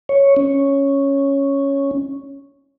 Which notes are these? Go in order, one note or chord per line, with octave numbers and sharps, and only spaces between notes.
C#5
C#4